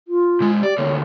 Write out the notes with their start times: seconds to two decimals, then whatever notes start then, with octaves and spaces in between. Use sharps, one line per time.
0.08 F4
0.40 A#2 G#3
0.63 G4 D5
0.78 D2 A#3 C#5